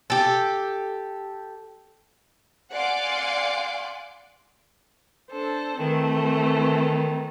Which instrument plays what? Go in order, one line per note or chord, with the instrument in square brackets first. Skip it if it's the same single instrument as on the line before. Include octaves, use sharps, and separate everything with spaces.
[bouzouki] G4 A4
[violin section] D5 F5 F#5 G#5 C6 D6
[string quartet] D4 A4 C5
[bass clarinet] D#3 [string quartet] E3 A3 C4